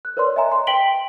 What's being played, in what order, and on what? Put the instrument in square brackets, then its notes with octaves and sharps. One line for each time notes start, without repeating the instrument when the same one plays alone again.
[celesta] F#6
A#4 B4 C#5 D5 C6
D#5 E5 G#5 A#5
A#5 C6
G5 C6 B6 D7 F#7 G7